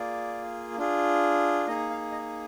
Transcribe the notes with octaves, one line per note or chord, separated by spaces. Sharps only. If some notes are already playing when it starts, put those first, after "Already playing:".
Already playing: A#3 F4 G#4 D5
D4 F4 G#4
A#3 D#4 G#4 D#5
F5
D#5